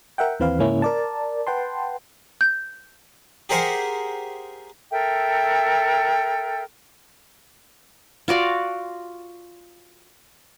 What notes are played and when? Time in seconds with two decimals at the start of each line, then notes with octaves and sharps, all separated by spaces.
0.18 A#4 E5 F#5 G5
0.40 D#2 E3 C4 B4 F5
0.58 G#2 C#3 A#3 C#4 E4
0.82 A#4 D5 A5
1.47 B4 F#5 G5 A5 C6
2.41 G6
3.49 G4 G#4 A#4 C5 E5 F#5
4.91 A4 A#4 E5 G5
8.28 F4 F#4 D5 F5